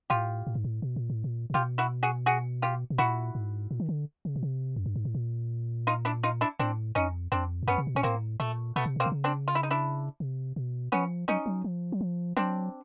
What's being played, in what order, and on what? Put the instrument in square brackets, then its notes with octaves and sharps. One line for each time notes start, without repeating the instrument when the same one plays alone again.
[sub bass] A2 [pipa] F4 G4
[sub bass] A2
G#2
A2
B2
A#2
A2
A#2
A#2
[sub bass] B2 [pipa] F4 G4
[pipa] E4 F#4
F#4 G#4
F#4 G#4
F4 G4
[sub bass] B2
[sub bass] A#2 [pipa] E4 F#4
[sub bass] G#2
A#2
D#3
D3
C#3
B2
C3
F#2
G2
G#2
A2
A#2
[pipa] D#4 F4
D4 E4
D#4 F4
D4 E4
[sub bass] A2 [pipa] C4 D4
[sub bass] F2 [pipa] C#4 D#4
[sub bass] F2 [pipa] C4 D4
[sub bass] G2
[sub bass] F#2 [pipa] B3 C#4
[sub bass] C3
B2
[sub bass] A#2 [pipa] C#4
[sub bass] A2 [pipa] A#3 C4
[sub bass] A#2 [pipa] A3
[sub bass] B2 [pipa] A3 B3
[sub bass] C3
[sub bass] B2 [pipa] A#3 C4
[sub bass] C3
C#3
[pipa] C4 D4
F4
E4
D#4
D4 E4
[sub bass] C3
B2
[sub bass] F3 [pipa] B3 C#4
[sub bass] F#3 [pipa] C#4 D#4
[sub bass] F#3
F3
F#3
F3
[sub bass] F#3 [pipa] C4 D4